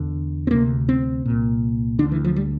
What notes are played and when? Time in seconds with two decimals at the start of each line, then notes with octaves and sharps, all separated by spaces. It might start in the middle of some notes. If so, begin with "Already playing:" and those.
Already playing: E2 D3
0.47 C4
0.51 D2 C3 A#3
0.89 C4
1.25 C2 A#2
1.99 D3 D4
2.03 D2
2.12 E3
2.24 F3
2.36 G3